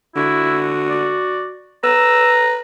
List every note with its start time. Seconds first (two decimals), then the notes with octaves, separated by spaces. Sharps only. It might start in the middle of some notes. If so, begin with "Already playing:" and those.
0.16 D3 E4 F#4
0.90 D5
1.84 B4 A#5 E6